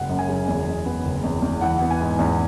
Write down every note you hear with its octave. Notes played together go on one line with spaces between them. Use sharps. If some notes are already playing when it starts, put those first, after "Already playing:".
Already playing: F#1 G#3 F#5
F#2
G#5
C#3
E2
G#3
B3
F#1
E2
E2
E3 F#5
B3
G#5
G#2
E2